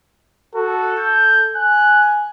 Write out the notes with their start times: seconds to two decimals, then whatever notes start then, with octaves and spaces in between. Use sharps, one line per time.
0.55 F#4 A4
0.99 G6
1.56 G#5 F#6